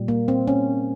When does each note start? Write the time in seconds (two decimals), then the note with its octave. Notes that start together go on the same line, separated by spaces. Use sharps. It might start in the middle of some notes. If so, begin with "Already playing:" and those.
Already playing: A#2 G3
0.08 A#3
0.28 C4
0.48 C#4